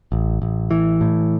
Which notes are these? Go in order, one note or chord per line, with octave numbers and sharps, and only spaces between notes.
A1
A1
E3
A2